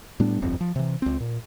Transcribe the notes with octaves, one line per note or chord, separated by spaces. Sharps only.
A2 G3 B3 D4
D1 G1 F2 C4
F3
C3 E3
C#2 C4
A#2